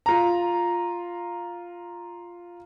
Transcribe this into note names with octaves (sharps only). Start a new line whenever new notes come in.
F4 A#5